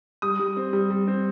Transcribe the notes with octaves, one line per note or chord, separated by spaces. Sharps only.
G3 D#6
G3
C4
G3
G3
C4